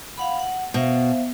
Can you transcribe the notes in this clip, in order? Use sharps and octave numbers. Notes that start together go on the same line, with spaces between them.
F5 F#5 B5
F#5
B2 C5 E5 F5